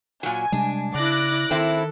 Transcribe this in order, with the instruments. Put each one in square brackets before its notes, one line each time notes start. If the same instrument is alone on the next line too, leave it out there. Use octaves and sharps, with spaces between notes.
[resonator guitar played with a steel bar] A#2 F#3 [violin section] G#5
[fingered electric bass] C3 G3 G#3 [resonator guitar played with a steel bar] D4
[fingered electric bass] C#3 [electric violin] E4 D5 [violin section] D6 F#6 A#6
[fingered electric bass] D#3 [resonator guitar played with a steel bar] C4 E4 [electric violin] A4